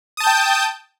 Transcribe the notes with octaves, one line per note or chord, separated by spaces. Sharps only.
G5 A5 D#6 G6